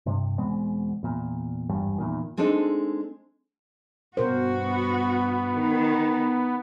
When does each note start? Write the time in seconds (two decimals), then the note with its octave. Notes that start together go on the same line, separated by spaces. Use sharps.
0.06 G2 C3
0.38 E2 B2 G#3 C4
1.03 E2 A#2
1.70 G#1 E2 G2 G3
1.98 E2 A#2 D#3
2.37 G#3 C4 D4 D#4 A4
4.17 G2 B2 F#4 A#4 C5
4.52 B3
5.53 D#3